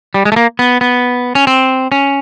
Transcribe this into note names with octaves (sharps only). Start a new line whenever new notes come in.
G3
G#3
A3
A#3
B3
B3
C#4
C4
C#4